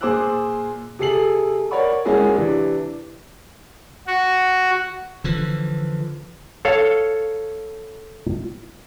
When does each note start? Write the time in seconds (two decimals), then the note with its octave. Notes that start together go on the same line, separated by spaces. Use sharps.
0.01 A#2 G#4 C5 D6 E6 F#6
0.99 C3 G#4 A4 C7 F#7
1.71 A#4 C#5 D5 F#5 B5 C#6
2.05 G#3 A#3 C#4 E4 F#4 G#4
2.35 C3 E3 D4
4.07 F#4
5.24 D3 E3 F3
6.65 A4 C#5 F5